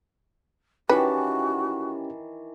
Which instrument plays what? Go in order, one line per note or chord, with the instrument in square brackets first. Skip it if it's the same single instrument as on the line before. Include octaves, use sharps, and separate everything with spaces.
[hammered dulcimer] D#3 E3 A5 [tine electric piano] C#4 E4 G4 [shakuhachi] F#4 [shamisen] B4